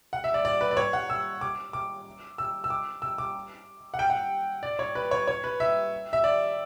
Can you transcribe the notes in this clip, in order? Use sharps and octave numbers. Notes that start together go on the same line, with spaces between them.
F#5
E5
D5
D5
B4
D5
C#5
F#5
E6
D6
D6
E6
E6
D6
E6
D6
F#5
G5
F#5
D5
C#5
B4
C#5
C#5
B4
E5
E5
D5